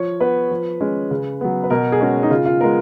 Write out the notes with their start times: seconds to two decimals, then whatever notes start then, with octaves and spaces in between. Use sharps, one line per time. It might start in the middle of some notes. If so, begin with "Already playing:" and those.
Already playing: F3 C#5
0.20 B3 B4
0.51 F3
0.81 G#3 C#4
1.11 C#3
1.41 F#3 B3
1.64 B4
1.70 B2 A#4
1.92 G#4
2.00 G#3 C#4 F#4
2.23 D#4
2.30 C#3 F4
2.46 F4
2.61 G#3 B3 A#4